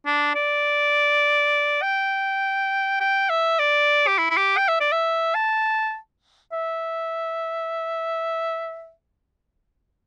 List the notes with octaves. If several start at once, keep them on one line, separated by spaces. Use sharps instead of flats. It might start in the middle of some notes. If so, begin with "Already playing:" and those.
D4
D5
G5
G5
E5
D5
G4
E4
E4
G4
G5
E5
D5
E5
A5
E5